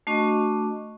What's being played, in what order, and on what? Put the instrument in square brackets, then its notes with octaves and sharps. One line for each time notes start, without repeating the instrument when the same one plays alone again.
[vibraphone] A3 D4 F#4 D#5 C#6 D6